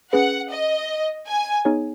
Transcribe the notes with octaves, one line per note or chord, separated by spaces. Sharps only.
C#4 G#4 B4 F#5
D#5
G#5
B3 D#4 G#4 C#5 G#5